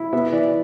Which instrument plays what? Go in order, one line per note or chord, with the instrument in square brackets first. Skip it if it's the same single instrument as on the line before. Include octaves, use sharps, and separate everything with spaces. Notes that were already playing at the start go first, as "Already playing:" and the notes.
Already playing: [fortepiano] E4
B3 E5
E3 D5